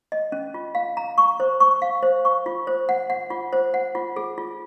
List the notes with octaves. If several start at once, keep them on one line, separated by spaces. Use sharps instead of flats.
D#5
C#4
F4
F5
A#5
C#6
C5
C#6
F5
C5
C#6
F4
C5
F#5
F#5
F4
C5
F#5
F4
G#4
F4